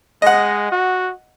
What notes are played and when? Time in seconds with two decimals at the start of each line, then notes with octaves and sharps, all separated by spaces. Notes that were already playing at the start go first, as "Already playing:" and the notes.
0.22 G#3 D#5 F#5
0.72 F#4